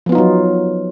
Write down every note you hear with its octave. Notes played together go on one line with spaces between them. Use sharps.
F3 F#3 B3 D#4 F4